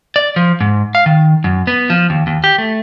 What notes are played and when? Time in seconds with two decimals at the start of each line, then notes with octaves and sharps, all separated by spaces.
0.16 D5
0.36 F3
0.61 G#2
0.95 F5
1.06 D#3
1.44 F#2
1.67 B3
1.90 F3
2.10 D#2
2.27 D#2
2.44 G4
2.58 A3